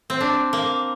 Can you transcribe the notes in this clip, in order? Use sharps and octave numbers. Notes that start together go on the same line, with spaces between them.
C4
D4
A#3